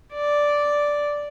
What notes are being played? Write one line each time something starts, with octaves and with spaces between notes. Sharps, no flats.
D5